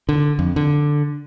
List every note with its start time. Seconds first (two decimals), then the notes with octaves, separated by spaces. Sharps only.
0.09 D3
0.39 F2
0.56 D3